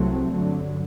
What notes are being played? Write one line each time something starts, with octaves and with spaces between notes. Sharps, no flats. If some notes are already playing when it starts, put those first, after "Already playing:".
Already playing: C2 C3 F#3 A3 C4
G2 D3 F#3